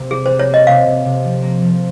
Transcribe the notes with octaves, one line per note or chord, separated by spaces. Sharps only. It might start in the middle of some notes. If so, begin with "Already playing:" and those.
Already playing: C3 A#3
G3 G#4
G3 C5
C#5
A#3 D#5
C3 F5
C3
C3
F3
A#3
F3